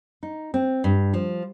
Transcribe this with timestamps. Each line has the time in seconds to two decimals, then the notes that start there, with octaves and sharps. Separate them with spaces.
0.23 D#4
0.54 C4
0.84 G2
1.14 F3